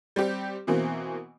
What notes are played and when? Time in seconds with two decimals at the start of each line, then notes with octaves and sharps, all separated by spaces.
0.16 G3 C4 G4
0.67 B2 E3 A#3 C4